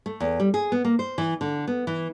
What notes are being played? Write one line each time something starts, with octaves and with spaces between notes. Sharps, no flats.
A3
E2
G3
G#4
B3
A#3
C5
E3
D3
B3
E3